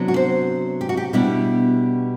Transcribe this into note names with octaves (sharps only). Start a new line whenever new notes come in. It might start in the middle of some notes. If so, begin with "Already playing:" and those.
Already playing: C3 F#3 B3 D4
F#4
C5
G4
F#4
G4
B2 G3 B3 D4 E4